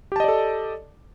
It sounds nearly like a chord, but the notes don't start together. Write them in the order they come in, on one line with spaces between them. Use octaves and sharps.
G4 A5 D#5 D5 A4